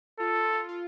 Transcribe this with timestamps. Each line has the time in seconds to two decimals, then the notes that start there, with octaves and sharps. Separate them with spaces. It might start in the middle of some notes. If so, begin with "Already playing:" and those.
0.19 F4 A4
0.36 F4
0.53 F4
0.69 F4